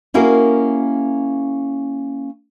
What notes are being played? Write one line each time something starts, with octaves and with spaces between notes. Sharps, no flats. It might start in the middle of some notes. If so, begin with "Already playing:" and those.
A#3 C#4 E4 F#4 G#4 A#4